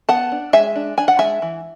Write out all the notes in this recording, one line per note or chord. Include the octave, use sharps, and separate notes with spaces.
B3 F#5 A5
D4
G#3 E5 G#5
D4
D4 G#5
F#5
G#3 E5 G#5
E3